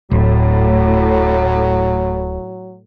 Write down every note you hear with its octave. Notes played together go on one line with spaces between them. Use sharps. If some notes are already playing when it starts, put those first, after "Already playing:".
D1 A2 F#3